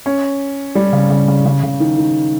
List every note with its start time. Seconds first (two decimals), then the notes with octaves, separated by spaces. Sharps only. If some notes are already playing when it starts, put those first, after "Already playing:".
0.06 C#4
0.75 G3
0.93 C#3
1.10 C#3
1.28 C#3
1.46 C#3
1.63 C#3
1.80 D#3
1.98 D#3